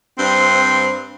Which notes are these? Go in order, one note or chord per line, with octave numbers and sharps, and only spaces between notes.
G2 C4